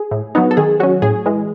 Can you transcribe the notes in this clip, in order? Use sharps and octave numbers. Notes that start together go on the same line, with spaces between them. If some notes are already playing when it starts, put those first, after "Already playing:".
Already playing: G#4
A2
F#3 B3 D#4
A4
D#3 G#4
F#3 C#4 F#4
A2 G#4
E3 G#3